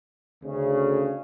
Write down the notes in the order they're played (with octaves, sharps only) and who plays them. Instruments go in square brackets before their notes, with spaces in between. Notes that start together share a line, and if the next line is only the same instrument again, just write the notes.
[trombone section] D2 C#3